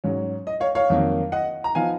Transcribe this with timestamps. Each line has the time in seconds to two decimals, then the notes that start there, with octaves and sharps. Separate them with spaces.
0.04 G#2 F#3 C#4
0.47 D#5
0.60 C#5 F5
0.75 C#5 F5
0.90 F2 D#3 F#3 A#3
1.32 D#5 F#5
1.64 A#5
1.75 F3 B3 D#4 F5 G#5